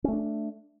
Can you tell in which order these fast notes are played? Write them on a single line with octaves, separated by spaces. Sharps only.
C#4 A3 D4